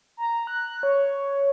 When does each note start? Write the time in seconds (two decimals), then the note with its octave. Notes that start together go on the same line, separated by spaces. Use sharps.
0.17 A#5
0.47 F#6
0.83 C#5